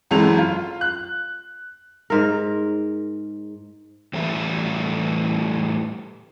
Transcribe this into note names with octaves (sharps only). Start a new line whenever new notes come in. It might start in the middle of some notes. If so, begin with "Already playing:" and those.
G#1 F#2 E3 G#3 A4 F7
F4
F#6
G#2 A#4
A2 E3 G3 A4 B4 E5